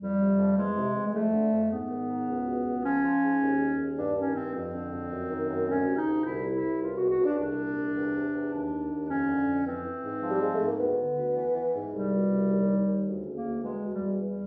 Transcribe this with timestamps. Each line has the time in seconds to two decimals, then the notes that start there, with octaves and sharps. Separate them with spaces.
0.01 F2 G3
0.20 C3
0.39 F2
0.58 E2 G#3
0.77 C3
0.95 E2
1.06 G#3
1.15 F2 A3
1.33 D3
1.53 F2
1.71 G#2 B3
1.90 D#3
2.09 G#2
2.28 C#2
2.47 B2
2.66 C#2
2.85 F3 C#4
3.04 F3
3.23 G#2
3.41 D#2
3.61 C#3
3.80 D#2
3.98 G2 D4
4.17 D#3 C#4
4.36 G2 C4
4.55 F2 C4
4.74 D3
4.93 F2
5.12 F#2
5.31 D#3
5.49 F#2
5.69 D2 C#4
5.87 C3
5.97 D#4
6.07 D2
6.26 C2 E4
6.44 C3
6.54 E4
6.63 C2
6.82 C#2 F4
6.97 B2 F#4
7.11 F#4
7.20 C#2 D4
7.39 C2 D4
7.58 A#2
7.77 C2
7.96 E2
8.15 C3
8.34 E2
8.53 D#2 D4
8.72 D#3
8.90 D#2
9.09 F2 C#4
9.28 D3
9.47 F2
9.66 E3 C4
9.85 E3
10.04 G#2
10.23 F3
10.28 G3
10.41 F3 G#3
10.54 A3
10.61 G#2
10.67 A#3
10.80 D2 B3
10.99 D3
11.17 D2
11.37 E3
11.55 E3
11.75 G#2
11.93 C2 G3
12.12 B2
12.31 C2
12.50 D#2
12.69 D#3
12.88 D#2
13.07 D2
13.25 C#3
13.35 A#3
13.45 D2
13.64 E2 G#3
13.83 B2
13.92 G3
14.02 E2
14.21 E3 G3